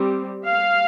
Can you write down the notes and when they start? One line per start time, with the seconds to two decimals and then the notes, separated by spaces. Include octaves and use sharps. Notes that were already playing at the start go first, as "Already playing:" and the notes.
Already playing: G3 C4
0.46 F5